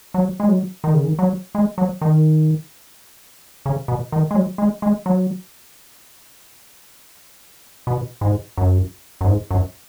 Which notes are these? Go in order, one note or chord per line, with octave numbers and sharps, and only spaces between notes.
F#3
G#3
F#3
D#3
C#3
D#3
F#3
G#3
F#3
D#3
C#3
B2
D#3
G#3
F#3
G#3
G#3
F#3
B2
G#2
F#2
F#2
G#2
F#2